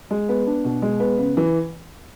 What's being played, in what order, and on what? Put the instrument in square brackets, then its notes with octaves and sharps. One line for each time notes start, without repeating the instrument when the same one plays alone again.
[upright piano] G#3
B3
D4
B2
G#3
B3
C#3
E3